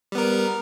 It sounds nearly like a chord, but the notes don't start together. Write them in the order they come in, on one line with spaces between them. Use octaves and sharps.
G3 B3 A#4